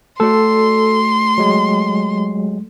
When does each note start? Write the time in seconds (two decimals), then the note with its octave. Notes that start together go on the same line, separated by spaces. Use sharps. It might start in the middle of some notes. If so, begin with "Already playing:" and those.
0.20 A3 F#4 A4 D5 C6
1.38 F#3 G#3